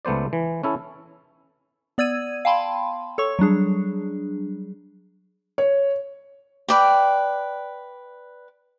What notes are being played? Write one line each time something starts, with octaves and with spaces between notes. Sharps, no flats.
C#2 A3 B3 C5 D5
E3
C#4 E4 A4
B3 D5 E6 G#6 D#7
F5 G5 A5 B5 C6
A4 C#5 C#6
F#3 G3 D4 G#4
C#5
B4 D5 G5